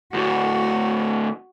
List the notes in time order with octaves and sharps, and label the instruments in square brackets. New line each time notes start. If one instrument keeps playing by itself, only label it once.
[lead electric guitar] D2 A2 [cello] F#4